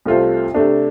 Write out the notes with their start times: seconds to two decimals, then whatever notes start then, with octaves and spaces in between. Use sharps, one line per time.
0.06 C2 C3 A3 F4 C5
0.54 C3 A3 D4